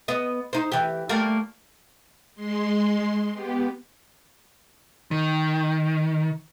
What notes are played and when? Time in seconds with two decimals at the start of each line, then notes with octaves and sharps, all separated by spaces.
0.08 B3 D#5
0.53 D#4 C5
0.72 E3 G4
1.09 G3 A3 A#3
2.35 G#3 C6
3.33 B3 G4
5.11 D#3